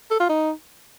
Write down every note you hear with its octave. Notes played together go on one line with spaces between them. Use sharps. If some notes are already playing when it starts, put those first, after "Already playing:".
A4
F4
D#4